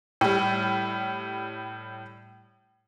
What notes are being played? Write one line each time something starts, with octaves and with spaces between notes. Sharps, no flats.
A2 G3